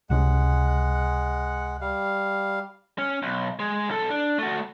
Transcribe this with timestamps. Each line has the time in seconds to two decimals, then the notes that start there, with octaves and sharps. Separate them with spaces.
0.10 C#2 C3 G#3 C#4 F#5
1.81 G3 F5
2.98 C#4
3.23 B1
3.59 G#3
3.88 B1 A4
4.10 D4
4.38 A3 F#4